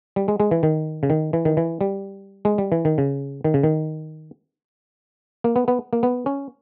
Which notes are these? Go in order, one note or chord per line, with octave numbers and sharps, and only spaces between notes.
G3
G#3
G#3
E3
D#3
C#3
D#3
E3
D#3
E3
G3
G#3
G3
E3
D#3
C#3
D#3
C#3
D#3
A#3
B3
B3
A#3
B3
C#4